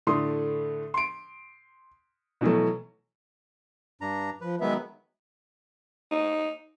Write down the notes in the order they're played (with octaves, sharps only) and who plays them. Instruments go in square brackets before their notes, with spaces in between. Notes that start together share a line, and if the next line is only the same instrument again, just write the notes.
[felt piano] A2 D3 A3 C6 D#6
C6 D7
B2 E3 F#3 A3
[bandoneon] G2 D4 A#5
[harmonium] F3 [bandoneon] B4
[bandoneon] D#3 F#3 B3 [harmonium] G#3 B4 E5
[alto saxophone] D#4